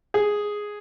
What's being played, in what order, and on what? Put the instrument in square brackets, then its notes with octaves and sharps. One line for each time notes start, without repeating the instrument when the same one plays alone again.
[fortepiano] G#4